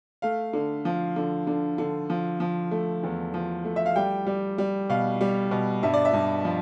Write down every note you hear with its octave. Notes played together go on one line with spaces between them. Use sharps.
A3 F5
D3
F3
D3
D3
D3
F3
F3
A3
E2
F3
A3
E5
F5
G3 G5
G3
G3
B2 F5
G3
B2
G2 E5
D5
E5
G2
F3